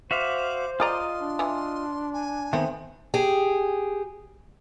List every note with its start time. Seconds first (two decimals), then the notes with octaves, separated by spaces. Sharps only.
0.11 F#4 C5 E5 F5 D6
0.80 F4 G#4 D5 D#5 A#5 C6
1.21 D4
1.39 E3
2.13 G#5
2.53 D#3 A3 B3 C4 C5
3.14 G4 G#4